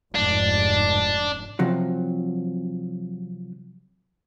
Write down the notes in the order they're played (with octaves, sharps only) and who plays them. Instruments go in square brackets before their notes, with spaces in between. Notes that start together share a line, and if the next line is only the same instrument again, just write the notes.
[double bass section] F1 G#2 [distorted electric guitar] D4
[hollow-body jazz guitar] C3 F3 F#3